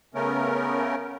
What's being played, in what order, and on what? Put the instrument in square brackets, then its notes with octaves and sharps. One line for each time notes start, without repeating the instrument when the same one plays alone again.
[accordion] C#3 A3 B3 C#4 A#4